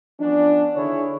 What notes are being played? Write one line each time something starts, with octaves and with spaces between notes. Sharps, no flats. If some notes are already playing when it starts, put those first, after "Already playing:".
F3 B3 C#4 D4
D3 D#3 E4 G#4 C#5